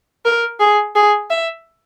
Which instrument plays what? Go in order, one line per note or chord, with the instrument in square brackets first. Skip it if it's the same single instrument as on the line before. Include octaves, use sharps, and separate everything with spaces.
[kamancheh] A#4
G#4
G#4
E5